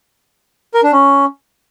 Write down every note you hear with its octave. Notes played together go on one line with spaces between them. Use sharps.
A#4
D4
C#4